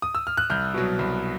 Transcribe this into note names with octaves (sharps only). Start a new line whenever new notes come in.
D#6
E6
F6
F#6
C2 F6 G6
B2 F#3
C2